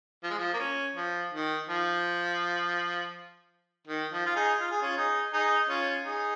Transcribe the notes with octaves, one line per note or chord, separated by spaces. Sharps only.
F3
G#3
F3
A#3
C#4
F3
D#3
F3
D#3
F3
F4
D#4 G#4
F4
G#4
C#4 F4
D#4 G#4
D#4 G#4
C#4 F4
D#4 G#4